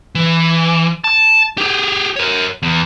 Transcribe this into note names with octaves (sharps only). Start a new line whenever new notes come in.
E3
A5
G4 G#4
A#4 C#5
E2